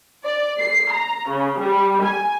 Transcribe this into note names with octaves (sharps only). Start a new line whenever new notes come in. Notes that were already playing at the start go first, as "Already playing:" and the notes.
D5
C7
A#5
C#3
G3
G#5